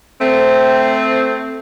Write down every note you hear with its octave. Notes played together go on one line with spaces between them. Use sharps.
A3 C4